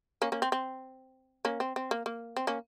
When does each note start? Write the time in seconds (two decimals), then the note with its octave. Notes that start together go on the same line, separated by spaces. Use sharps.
0.22 A#3 C#4
0.32 A#3 C#4
0.42 C4
0.52 C4
1.45 A#3 C#4
1.60 C4
1.76 C4
1.91 A#3
2.06 A#3
2.36 C4
2.47 A#3 C#4